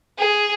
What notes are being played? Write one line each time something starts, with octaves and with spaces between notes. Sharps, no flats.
G#4